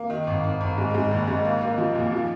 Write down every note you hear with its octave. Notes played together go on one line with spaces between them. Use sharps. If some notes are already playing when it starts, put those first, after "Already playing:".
Already playing: A#3
D#3
G#1
G#1
G#1
G#2
G#2
A#1
G#2
A#3
A#3
F3
A#2
F3